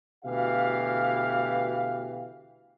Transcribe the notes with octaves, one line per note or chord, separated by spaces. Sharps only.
D2 B2 E3 G4 F5